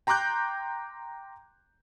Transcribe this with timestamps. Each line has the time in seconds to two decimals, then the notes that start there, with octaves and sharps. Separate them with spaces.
0.07 G5 A#5 C6 D6 F#6 G6